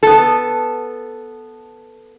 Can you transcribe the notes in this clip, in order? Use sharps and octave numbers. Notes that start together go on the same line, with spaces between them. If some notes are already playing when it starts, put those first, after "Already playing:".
B3 A4